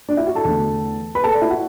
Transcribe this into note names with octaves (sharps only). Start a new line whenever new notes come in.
D4 D5
E4 E5
F#4 F#5
A4 A5
E2 D3 A3
B4 B5
A4 A5
D5
E4 E5
F#4 F#5